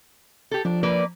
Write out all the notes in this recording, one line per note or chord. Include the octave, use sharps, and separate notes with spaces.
G4 A4
F3 D4
A#3 B4 D5